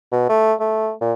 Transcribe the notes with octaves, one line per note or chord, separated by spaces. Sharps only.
B2
A3
A3
A#2